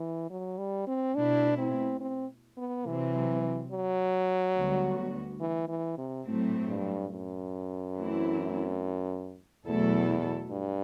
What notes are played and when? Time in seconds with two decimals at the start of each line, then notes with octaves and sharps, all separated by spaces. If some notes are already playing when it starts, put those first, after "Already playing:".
Already playing: E3
0.30 F#3
0.58 G3
0.87 C4
1.15 B2 A3 D4 E4
1.58 C4
2.01 C4
2.57 B3
2.85 C3 E3 F#3 C4
3.71 F#3
4.56 D2 D3 G3 B3 F#4
5.40 E3
5.68 E3
5.98 C3
6.26 A2 F#3 A3 C4
6.68 G2
7.11 F#2
7.96 E3 A3 C4 E4
9.65 E2 B2 F#3 A3 E4 A4
10.51 G2